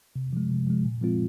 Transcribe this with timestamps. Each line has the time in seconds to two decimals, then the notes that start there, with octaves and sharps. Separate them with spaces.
0.16 C3
0.33 F3 G#3
0.50 C3
0.67 F3 G#3
0.85 A#2
1.01 F3 G#3 C4 F4